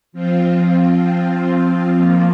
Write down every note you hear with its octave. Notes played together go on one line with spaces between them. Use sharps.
F3 C4 F4
F3 C4 F4
F3 A#3 F4